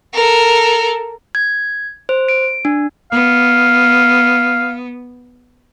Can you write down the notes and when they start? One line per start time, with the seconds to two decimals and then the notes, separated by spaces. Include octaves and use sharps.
0.13 A4 A#4
1.35 G#6
2.09 C5
2.28 D7
2.65 D4
3.12 B3 F5